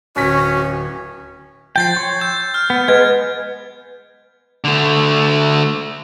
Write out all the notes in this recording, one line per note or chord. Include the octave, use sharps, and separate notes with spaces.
D1 C#4 F#4 B6
F3 G5 G6 A6 C7
C#5 C6
E6 G6
F6
B3
G#3 B3 B4 D#5 G#5 G#6
D3 A3